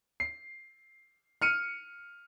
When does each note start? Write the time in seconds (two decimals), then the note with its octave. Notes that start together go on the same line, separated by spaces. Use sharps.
0.20 C7
1.42 F6 C#7 D#7